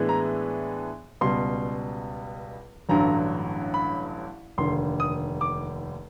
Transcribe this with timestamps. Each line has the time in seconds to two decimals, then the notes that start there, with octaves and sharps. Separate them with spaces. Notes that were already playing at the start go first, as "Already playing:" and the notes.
Already playing: A2 E3 G#3 B3 D4
0.09 A#5
1.21 C#2 B2 G3 C6
2.89 A1 G2 D3 F#3 A#5
3.74 B5
4.58 F1 D#2 D3 C6
5.00 D#6
5.41 D6